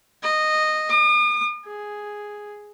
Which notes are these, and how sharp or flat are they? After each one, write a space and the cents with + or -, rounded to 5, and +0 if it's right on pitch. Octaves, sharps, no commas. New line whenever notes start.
D#5 -10
D#6 -45
G#4 +0